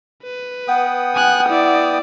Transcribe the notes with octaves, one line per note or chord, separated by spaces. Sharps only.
B4
B3 F#5 G5 D#6
G#5 F#6
E4 D5